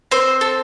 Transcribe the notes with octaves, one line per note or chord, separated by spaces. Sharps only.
C4 C5
A4